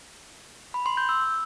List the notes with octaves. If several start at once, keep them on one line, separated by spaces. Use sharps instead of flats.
B5
C6
G6
E6